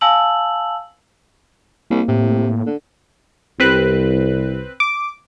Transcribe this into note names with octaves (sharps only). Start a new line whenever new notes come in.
F5 G#5 A5 E6 F#7
C2 A#3
A2 C3
D3
C2 C4 B4 F#6
D6